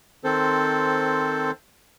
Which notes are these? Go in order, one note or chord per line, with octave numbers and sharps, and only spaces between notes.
D#3 C4 A4 C5